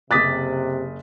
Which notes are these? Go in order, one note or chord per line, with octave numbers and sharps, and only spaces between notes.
F#1 C3 D6 D#6 F#6 A6 B6